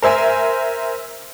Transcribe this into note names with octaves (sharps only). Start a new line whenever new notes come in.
A#4 C5 E5 G#5